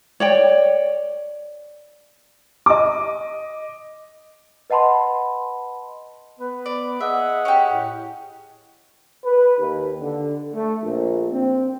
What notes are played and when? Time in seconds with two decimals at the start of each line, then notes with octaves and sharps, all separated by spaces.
0.20 C#5 D5 G5
2.66 D#5 D6
4.70 B4 D#5 F#5 A5 B5 C6
6.40 B3 B4
6.66 D5
7.00 G#4 D#5 E5 F#5
7.45 C#4 G4
7.72 A2
9.25 B4
9.57 D#2
10.01 D3
10.52 A3
10.83 A#1
11.31 C4